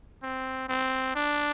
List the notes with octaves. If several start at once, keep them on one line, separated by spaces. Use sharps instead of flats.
C4
C4
D4